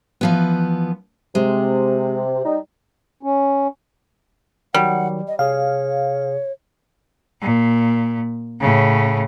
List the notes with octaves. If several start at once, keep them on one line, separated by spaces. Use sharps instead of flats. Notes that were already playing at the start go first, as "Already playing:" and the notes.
E3 F3 B3
C3 G#3
G3 D#4
C#4
D#3 F#3 G3 F#5
D#5
C3 G#4 C#5 F5
A#2
A2 C#3